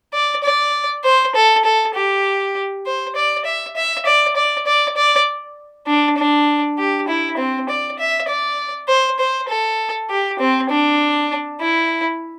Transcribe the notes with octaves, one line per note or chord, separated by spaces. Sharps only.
D5
D5
C5
A4
A4
G4
C5
D5
E5
E5
D5
D5
D5
D5
D4
D4
G4
E4
C4
D5
E5
D5
C5
C5
A4
G4
C4
D4
E4